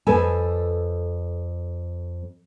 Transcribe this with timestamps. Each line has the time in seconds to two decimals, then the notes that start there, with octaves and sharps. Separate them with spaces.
0.07 F2 A4 B4 G#5